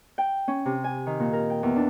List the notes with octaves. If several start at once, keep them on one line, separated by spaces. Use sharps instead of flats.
G5
C#4
C3
G#5
D#3
A#2
A#4
G5
E2
D4